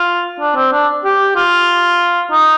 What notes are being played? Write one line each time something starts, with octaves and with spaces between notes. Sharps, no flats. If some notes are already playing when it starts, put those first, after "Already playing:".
Already playing: F4
D4
C4
D4
G4
F4
D#4